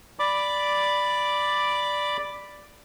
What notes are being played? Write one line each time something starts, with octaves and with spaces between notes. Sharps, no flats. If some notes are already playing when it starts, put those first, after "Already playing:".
D5 B5 D6